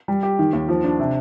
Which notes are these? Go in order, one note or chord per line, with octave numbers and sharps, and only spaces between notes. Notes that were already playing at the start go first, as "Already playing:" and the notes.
G3
G4
D#3
D#2
F3
D4
C3